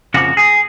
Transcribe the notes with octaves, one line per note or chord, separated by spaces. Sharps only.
F2 C#3 F3 A#3 F#4
G#4